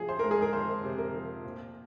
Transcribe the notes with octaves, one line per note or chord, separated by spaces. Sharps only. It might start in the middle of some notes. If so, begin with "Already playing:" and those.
Already playing: C3 F3 G#4
C5
G#3 A#4
G#4
A#4
F2 C5
C3
A#4
F3
A#2